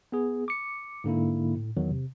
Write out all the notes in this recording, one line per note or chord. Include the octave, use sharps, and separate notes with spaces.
B3 G#4
D6 C#7
G#2 D3 A#3 E4
A2
E2 D#3 F#3
C3